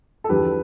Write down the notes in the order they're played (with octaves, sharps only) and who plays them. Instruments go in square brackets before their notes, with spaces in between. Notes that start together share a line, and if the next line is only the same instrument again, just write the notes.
[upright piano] A4
E2 D3 F3 G4 B4